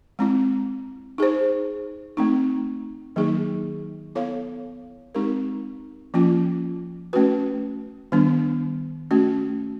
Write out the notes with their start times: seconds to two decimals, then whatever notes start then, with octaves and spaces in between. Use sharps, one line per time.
0.19 G#3 C4 E4
1.18 D#4 G#4 C5
2.17 A3 C4 D#4
3.16 D#3 F#3 A#3 D#4 G#4
4.15 B3 E4 A4 C#5 F5
5.15 G#3 C4 D#4 G4 A#4
6.14 F3 A#3 C#4 F4
7.13 A3 C#4 F#4 B4
8.12 D#3 G3 B3 D4
9.11 A3 C#4 F#4